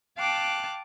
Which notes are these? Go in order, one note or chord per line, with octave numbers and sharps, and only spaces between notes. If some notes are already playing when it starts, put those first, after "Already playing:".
F5 G5 A5 D6 F#6